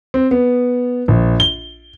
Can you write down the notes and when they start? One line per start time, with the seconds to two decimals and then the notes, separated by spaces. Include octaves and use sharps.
0.14 C4
0.31 B3
1.08 A#1
1.40 G7